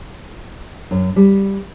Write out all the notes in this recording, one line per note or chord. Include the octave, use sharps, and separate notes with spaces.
F#2
G3